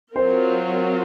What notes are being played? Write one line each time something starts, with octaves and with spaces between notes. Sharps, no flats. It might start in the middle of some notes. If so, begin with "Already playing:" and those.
F#3 C4 F4 A#4 C5